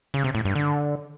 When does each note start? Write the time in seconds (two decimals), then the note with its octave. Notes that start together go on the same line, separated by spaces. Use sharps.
0.14 C#3
0.24 C3
0.35 A2
0.45 G2
0.55 D3